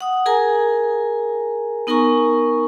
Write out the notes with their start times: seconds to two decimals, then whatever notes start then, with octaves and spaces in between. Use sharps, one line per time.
0.01 F#5 D#6
0.26 G#4 A#4 G#5 A#5
1.87 B3 D#4 A#4 G#5 A#5 C#6